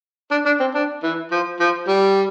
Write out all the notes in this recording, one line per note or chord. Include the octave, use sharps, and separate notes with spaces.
D4
D4
C4
D4
E3
F3
F3
G3